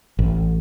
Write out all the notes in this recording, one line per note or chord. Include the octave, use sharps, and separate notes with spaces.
A1